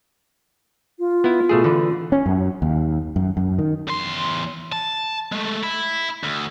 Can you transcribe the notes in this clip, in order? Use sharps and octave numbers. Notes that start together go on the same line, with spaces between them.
F4
B3 E4
B2 A3 G#4
D3 E3 B4
C#4
F#2
D#2
F#2
F#2
D#3
E2 C6
A5
G#3 A3
E4
D2